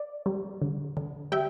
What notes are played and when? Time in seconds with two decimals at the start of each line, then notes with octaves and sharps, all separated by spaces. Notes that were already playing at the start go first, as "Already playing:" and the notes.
Already playing: D5
0.26 G3
0.62 D3
0.97 D3
1.32 G3 E5 G5